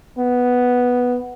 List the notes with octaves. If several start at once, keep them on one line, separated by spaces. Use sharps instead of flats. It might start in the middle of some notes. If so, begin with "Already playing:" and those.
B3